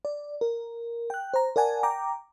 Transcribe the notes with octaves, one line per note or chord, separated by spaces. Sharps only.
D5
A#4
G5 F#6
C5 A#5
A#4 D5 F#5 G#5 A5
G5 A#5 D6